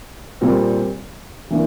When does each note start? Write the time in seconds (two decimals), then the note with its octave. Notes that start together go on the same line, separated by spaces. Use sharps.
0.41 A#2 G3 C4
1.50 E3 A#3 D4